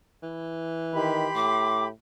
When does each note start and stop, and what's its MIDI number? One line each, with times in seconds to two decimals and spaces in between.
0.23 1.55 52
0.94 1.26 51
0.94 1.87 67
0.94 1.87 83
0.94 1.87 84
1.35 1.90 45
1.35 1.84 86